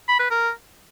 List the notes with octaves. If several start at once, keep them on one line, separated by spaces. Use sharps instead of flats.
B5
B4
A#4